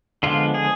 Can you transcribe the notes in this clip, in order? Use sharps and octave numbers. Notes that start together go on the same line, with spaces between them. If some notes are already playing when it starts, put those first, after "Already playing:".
D3 F3 G#3 B3 F4
G#4